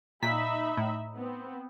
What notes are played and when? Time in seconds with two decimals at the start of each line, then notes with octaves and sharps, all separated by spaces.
0.23 A#2 D#4 E5 B5 B6
0.77 A2
1.14 B3 C4